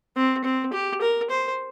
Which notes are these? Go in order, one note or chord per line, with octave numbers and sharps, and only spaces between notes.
C4
C4
G4
A#4
C5